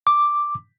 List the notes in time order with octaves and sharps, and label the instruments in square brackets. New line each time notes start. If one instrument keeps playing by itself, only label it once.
[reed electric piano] D6